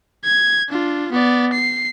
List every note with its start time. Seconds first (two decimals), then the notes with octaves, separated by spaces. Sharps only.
0.25 G#6
0.69 D4 F4
1.12 B3 D5
1.53 C7